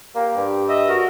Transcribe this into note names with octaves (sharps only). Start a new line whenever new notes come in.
A#3 G4
G2
D#5 E5
F#4 A#4